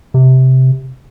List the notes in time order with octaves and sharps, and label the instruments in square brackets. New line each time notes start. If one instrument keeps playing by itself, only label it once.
[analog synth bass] C3